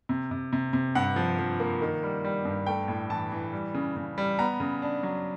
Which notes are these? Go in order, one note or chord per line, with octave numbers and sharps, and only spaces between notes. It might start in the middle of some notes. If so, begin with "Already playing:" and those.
C3
C3
C3
C3
G2 F#5
F3
F3
A#3
D#3
G3
G3
G2
A3 G5
A2
E3 A5
E3
G3
C#3
C#3
G3
B3 A#5
C#3
D4
F#3